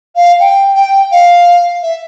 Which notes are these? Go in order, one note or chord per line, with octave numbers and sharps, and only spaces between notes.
F5
G5
G5
F5
E5